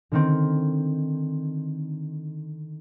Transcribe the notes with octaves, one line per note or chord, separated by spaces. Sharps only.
D3 D#3 C4